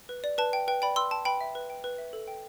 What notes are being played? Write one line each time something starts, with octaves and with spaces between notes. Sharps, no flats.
B4
D5
B4 A5
G5
B4 G5
D5 G5 B5
B4 C6 E6
G5 A5
B4 G5 B5
E5
B4
G5
B4
E5
A4
G5